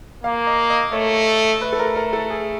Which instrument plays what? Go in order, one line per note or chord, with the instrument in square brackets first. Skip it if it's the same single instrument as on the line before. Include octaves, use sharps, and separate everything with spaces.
[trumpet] A#3 [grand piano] F5
[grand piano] D#5
D#5
[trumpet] A3 [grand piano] C#5
[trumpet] A3 [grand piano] B4
[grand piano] A4
A#4
A#4
A4
G#4